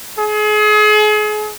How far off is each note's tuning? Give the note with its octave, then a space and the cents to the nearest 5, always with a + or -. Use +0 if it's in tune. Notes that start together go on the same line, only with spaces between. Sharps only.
G#4 +35